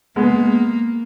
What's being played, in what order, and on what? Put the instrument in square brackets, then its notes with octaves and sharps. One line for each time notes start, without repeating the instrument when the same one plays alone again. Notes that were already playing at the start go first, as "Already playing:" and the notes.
[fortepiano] G#3 B3 [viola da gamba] A#3